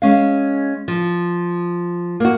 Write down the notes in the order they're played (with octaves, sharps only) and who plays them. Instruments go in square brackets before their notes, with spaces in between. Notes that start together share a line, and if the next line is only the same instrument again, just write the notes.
[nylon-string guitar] G#3 C#4 F5
F3
A#3 F#4